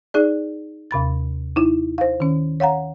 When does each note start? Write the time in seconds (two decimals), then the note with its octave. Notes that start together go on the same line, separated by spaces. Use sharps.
0.14 D#4 G#4 D5
0.91 D#2 C3 B5 A6
1.56 D#4 E4
1.98 C5 F5
2.20 D#3 C#4
2.60 C#5 F5 F#5 A#5